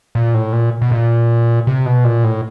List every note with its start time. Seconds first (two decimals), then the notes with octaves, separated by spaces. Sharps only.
0.15 A#2
0.34 A2
0.53 A#2
0.82 B2
0.91 A#2
1.67 C3
1.86 B2
2.04 A#2
2.24 A2